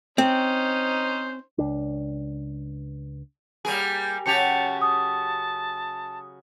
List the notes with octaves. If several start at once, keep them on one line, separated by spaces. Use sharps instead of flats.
C4 C#4 D#4 C5
C#2 D4
G3 A#3 G#4
C#3 F#3 G4 A5 C#7 F7
A5 D#6